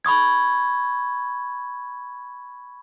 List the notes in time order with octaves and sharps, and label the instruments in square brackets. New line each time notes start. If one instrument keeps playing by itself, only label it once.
[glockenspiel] B5 C#6 D#6 G#6